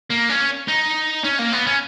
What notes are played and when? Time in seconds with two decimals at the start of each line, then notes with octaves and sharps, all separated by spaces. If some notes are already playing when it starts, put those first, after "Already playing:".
0.10 A#3
0.29 C#4
0.68 D#4
1.24 C#4
1.39 A#3
1.53 B3
1.67 C#4